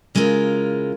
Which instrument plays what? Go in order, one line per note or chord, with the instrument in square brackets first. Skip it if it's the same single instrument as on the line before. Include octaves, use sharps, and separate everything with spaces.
[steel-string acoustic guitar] C#3 G#3 E4 F4 A#4